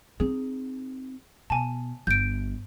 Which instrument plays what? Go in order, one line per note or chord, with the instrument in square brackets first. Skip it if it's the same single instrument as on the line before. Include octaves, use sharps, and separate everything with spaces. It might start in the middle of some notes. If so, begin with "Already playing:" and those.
[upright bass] C4 D#4 [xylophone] G#4
[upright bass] B2 [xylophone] G#5 A5
[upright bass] G1 [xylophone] G6 D7